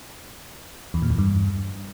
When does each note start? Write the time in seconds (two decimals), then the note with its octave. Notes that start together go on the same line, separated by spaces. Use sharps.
0.94 E2
1.02 A#2
1.10 E2
1.18 G2